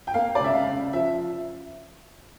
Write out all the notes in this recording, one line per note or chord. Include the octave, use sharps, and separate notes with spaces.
G5
A#3 F5
D5
C#2 E5
F5
C#3
F3 E5